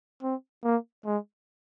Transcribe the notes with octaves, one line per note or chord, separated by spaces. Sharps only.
C4
A#3
G#3